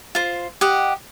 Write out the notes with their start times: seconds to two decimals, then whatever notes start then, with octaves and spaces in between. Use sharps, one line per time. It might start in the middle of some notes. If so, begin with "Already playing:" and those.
0.15 F4 C5
0.61 G4 D#5 F#5